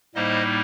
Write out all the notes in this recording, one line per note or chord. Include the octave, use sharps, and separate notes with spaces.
A2 G3 A#3 D#4 C5 D#5